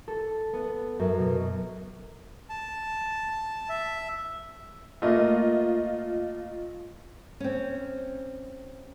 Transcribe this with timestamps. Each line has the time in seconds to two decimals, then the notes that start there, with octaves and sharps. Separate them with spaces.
0.08 A4
0.53 B3
0.99 F#2
1.19 B2
2.49 A5
3.69 E5
5.02 A3 A#3 F4 D#5
7.40 C4 C#4